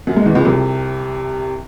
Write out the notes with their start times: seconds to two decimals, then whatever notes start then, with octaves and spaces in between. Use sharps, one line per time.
0.07 F#2 F#3
0.17 G#2 G#3
0.26 E2 E3
0.35 C#2 C#3
0.45 C2 C3